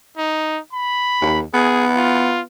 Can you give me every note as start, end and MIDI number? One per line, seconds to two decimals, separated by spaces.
0.17 0.59 63
0.73 1.40 83
1.22 1.43 39
1.54 2.44 59
1.54 1.86 68
1.96 2.41 65